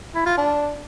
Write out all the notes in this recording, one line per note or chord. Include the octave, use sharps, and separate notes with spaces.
E4
F4
D4